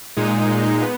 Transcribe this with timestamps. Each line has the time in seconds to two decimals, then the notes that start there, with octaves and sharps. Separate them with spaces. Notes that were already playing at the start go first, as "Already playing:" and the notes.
0.17 A#2 G#3 D#4
0.82 B3